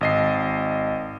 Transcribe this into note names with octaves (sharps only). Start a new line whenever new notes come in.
G#1 D#5 C7